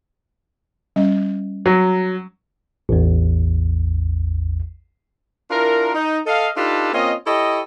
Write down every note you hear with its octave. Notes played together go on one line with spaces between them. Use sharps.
G3 C#4 D#5
F#3
A1 E2
D4 E4 F4 A#4
D#4
A4 D#5 F5
D4 D#4 F4 G4 A4 B4
A#3 C4 C#4 F4 D#5
E4 G4 A4 C#5 D#5